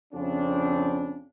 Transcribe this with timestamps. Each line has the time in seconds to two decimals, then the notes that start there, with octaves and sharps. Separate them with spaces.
0.14 F2 C#3 C4 D4